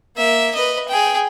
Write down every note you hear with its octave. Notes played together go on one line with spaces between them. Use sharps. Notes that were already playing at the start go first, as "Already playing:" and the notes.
A#3 E5
B4 D#5
G#4 G5